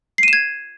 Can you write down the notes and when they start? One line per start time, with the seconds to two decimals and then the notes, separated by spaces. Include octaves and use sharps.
0.18 C7
0.23 D#7
0.28 E7
0.33 G#6